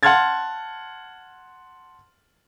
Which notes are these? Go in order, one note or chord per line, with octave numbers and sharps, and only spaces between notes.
F#5 A5 C6 F6 G#6 A6